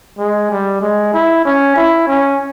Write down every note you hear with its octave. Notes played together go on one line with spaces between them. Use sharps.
G#3
G3
G#3
E4
C#4
E4
C#4